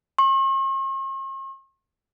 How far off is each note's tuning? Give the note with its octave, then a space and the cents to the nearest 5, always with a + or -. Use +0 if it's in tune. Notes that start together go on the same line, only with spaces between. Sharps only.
C#6 -45